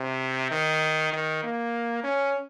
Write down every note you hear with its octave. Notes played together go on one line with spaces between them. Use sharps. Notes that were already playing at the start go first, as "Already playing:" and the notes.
Already playing: C3
D#3
D#3
A#3
C#4